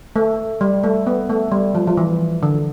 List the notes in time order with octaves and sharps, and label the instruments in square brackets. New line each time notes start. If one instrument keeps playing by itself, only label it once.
[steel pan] A3
G3
A3
B3
A3
G3
F3
F3
E3
D3